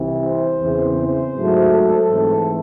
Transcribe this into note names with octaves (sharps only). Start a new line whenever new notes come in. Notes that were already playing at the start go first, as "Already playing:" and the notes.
Already playing: C2 C3 E3 C4
C5
E2 C#3 E3 C4
C5
G#2 F#3 A3
A4
G#2 E3 A3 C4